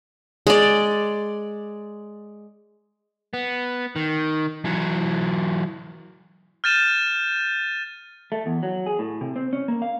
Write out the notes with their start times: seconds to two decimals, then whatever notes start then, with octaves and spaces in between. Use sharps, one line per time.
0.47 G#3 D5
3.34 B3
3.96 D#3
4.65 E3 F#3
6.64 F6 G6 A6 D#7 E7
8.32 A3
8.46 E2
8.63 F#3
8.86 G#4
8.99 A2
9.21 C3
9.36 C4
9.53 C#4
9.68 A#3
9.82 F5